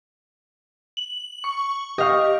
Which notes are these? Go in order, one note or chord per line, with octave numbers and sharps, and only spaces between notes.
F#7
C#6
G4 D#5 F5 C#6